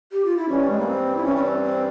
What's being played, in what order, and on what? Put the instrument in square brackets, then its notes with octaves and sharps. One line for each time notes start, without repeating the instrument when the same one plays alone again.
[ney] G4
F4
E4
[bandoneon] G2 E3 G3 [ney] C#4
[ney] G#3
A#3
C4
E4
[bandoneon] G2 E3 G3 [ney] C#4
[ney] C#4
C4
C4